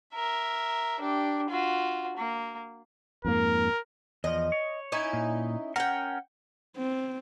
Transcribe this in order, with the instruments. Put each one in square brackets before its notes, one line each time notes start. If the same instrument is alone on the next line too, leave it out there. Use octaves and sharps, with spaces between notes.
[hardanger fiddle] A#4 E5
D4 G4
F4 F#4
A#3
[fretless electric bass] F2 G#2 A#3 [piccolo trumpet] A#4
[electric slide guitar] E2 F3 [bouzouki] D#5
[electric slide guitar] C#5
[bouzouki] C#4 D#4 E4
[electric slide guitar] A#2
[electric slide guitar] C#4 A#4 [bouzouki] F#5 G5
[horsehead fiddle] C4